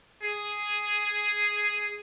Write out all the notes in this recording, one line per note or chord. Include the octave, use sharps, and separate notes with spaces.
G#4